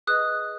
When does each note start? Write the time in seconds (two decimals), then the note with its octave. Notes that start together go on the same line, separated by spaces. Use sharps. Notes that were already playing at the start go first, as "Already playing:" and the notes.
0.07 G#4 B4 D#5 D#6 F#6